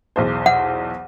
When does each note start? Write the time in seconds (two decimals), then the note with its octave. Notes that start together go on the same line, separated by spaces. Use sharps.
0.16 B1 E2 C5
0.46 F#5